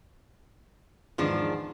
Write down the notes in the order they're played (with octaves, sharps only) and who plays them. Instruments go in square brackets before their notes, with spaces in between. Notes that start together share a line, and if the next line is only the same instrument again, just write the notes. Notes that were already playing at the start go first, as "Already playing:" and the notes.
[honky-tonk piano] E2 G#2 [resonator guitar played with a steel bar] D#3 F3 D4